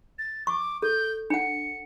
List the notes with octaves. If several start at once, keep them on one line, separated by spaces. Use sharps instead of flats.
A6
C#6 D6
A4 G6
D4 F#5 C#7